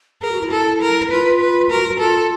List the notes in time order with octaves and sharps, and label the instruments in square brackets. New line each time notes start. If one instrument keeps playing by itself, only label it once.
[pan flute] G#4 [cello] A#4
[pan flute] F#4
E4
[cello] A4
A#4
[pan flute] F4 [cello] B4
[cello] B4
[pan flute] F#4 [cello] A#4
[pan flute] F4 [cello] A4